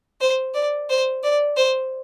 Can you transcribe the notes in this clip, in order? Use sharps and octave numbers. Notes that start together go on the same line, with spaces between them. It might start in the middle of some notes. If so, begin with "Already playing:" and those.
C5
D5
C5
D5
C5